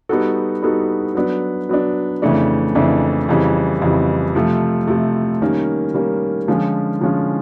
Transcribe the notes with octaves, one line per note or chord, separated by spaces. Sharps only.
G3 B3 D#4 F#4 A4
G3 B3 D#4 F#4 A4
F#3 B3 D4
F#3 B3 D4
F2 C#3 E3 A3 D4
F2 C#3 E3 A3 D4
F2 C#3 E3 G3
F2 C#3 E3 G3
C3 F3 A3
C3 F3 A3
D#3 G3 A#3 C#4
D#3 G3 A#3 C#4
D3 F3 G#3 C#4 F4
D3 F3 G#3 C#4 F4